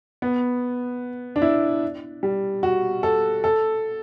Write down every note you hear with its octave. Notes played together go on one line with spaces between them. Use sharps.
B3
D4
E4
G3
F#4
A4
A4